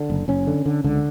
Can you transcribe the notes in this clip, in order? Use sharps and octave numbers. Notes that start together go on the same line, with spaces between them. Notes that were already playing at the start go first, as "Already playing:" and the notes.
Already playing: D3
F#1
F#1 C#4
D3
D3
C#2 D3